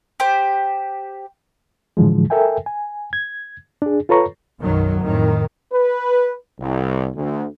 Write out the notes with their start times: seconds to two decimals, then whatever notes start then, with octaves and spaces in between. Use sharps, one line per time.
0.20 G4 C5
1.97 A2 D3 E3 F3 G#3
2.30 A4 A#4 E5 G5 G#5
2.66 G#5
3.13 G#6
3.82 D4 G#4
4.09 F4 A4 B4 C#5 A#5 C#6
4.60 B1 F#2 D#3 F#3
5.02 F2 A2 D#3
5.72 B4
6.59 C2
7.16 D2